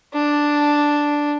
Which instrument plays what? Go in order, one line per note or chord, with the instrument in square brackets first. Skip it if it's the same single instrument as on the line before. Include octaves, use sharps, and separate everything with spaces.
[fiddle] D4